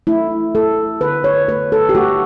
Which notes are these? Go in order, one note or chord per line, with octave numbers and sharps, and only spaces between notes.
A3 E4
A3 A4
D3 B4
C#5
A3 B4
A4
G4
A3 F#4